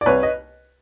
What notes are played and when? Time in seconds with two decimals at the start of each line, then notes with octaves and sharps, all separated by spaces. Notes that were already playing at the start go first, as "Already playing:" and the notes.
0.01 D5
0.06 C2 B4 C#5
0.23 D#5